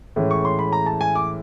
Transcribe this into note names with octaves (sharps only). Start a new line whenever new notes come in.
A2 E3 G#3 C#4
C#6
C6
B5
A#5
A5
G#5
D6